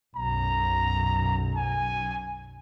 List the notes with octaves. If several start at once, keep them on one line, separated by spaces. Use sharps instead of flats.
B1 F#2 A#5
G#5